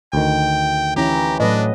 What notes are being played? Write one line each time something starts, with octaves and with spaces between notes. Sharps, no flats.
D2 D#3 G5
E3 C#4 E4 G4 A#5
A2 F#3 D4 B4 D#5